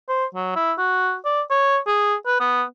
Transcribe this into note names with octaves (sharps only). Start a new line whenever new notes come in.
C5
F#3
E4
F#4
D5
C#5
G#4
B4
B3